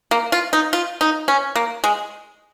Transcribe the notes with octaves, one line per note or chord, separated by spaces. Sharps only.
A#3
F4
D#4
F4
D#4
C#4
A#3
G#3